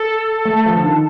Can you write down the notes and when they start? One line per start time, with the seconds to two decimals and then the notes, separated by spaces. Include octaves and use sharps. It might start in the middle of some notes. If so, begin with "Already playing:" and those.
Already playing: A4
0.45 A3
0.65 F3
0.76 D3
0.84 D#3